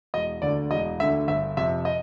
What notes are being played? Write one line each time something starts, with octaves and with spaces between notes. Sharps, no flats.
E1 D#5
D2 D3 D5
E1 D#5
D2 D3 E5
G1 E5
F2 C3 E5
D#5